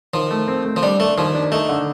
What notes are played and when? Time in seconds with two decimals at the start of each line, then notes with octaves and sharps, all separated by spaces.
0.14 D#3 F3
0.31 A3
0.48 C4
0.65 A3
0.76 F3
0.82 G3 D4
1.00 A3 D4
1.17 D#2 F3
1.35 D4
1.52 A3 D#4
1.69 D3